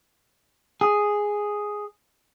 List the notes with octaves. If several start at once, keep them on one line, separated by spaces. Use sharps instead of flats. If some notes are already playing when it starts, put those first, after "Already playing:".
G#4